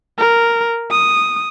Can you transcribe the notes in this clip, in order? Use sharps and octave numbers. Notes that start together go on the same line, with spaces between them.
A#4
D#6